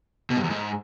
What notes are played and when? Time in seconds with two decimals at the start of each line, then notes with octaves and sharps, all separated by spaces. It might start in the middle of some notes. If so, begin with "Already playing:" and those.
0.30 B2
0.37 G2
0.44 E2
0.50 G#2